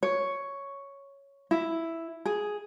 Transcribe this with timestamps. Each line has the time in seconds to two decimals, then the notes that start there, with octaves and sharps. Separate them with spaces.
0.03 C#5
1.51 E4
2.25 G#4